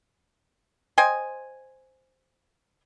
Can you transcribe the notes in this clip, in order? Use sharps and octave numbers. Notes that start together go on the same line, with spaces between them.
C5 D#5 G5 G#5